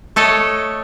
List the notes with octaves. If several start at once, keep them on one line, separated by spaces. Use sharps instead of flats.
A3 A4 C#5 D#5